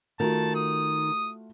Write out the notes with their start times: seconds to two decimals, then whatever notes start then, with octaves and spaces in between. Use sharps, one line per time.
0.20 D#3 A3 F4 F#4 A5
0.56 D#6